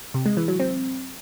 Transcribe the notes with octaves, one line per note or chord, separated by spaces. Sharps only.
C3
G#3
E3
F#3
C4